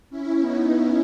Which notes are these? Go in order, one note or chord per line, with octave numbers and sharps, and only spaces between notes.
C#4 E4
B3 D#4
C#4 E4